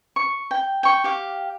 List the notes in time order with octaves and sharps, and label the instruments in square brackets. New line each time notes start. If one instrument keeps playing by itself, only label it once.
[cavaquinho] C#6
G5
G5 C#6
G4 F5